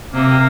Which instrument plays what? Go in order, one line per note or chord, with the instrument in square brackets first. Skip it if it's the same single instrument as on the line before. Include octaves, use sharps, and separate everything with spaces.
[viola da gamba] C3 [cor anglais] A#3